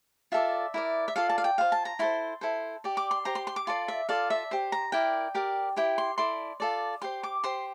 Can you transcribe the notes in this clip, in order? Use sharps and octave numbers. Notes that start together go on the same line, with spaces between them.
F4 A4 D5 E5
E4 A#4 D5
E5
F4 A4 D5 F5
A5
F5
G5
F4 C5 F5
A5
A#5
E4 A4 C5 C6
E4 A4 C5
G4 D5
D6
C6
G4 C5 A#5
C6
C6
D6
F4 A4 D5 C6
E5
F4 A4 D5 F5
E5
G4 C5
A#5
E4 A#4 D5 G5
G4 A#4 D5
E4 G4 C5 G5
C6
E4 A4 D5 C6
F4 A4 D5
G4 C5 C6
D6
G4 C5 C6